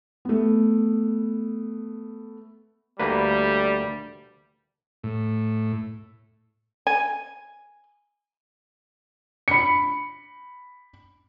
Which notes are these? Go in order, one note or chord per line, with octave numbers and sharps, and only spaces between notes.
A3 B3
D2 G3 A#3 B4
A2
G#5
B5 C#7